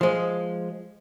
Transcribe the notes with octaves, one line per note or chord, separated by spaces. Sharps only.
F3 G#3